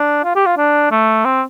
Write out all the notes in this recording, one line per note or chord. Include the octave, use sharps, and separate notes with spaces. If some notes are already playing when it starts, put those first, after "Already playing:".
Already playing: D4
F4
G4
F4
D4
A3
C4